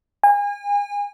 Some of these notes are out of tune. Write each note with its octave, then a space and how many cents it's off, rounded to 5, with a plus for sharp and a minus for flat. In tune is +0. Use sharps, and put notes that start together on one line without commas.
G#5 -35